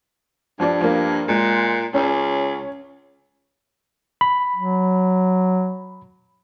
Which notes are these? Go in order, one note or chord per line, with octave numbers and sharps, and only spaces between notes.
G2 F3 D4
F3 A#3
A#2 G#3
C#2 C#4
B5
F#3